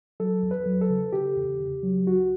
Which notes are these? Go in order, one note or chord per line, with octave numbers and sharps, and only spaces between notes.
F#3 A4
E2
B4
F#3
A4
C#3
C#3 G4
E2
C#3
F#3
C#2 F#4